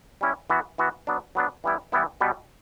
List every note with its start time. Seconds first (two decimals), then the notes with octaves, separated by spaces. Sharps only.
0.21 G3 C#4 E4
0.50 E3 B3 F#4
0.78 E3 B3 F#4
1.07 F#3 B3 D4
1.35 F#3 B3 D4
1.64 E3 G3 B3 E4
1.92 E3 G3 B3 E4
2.21 B2 G3 B3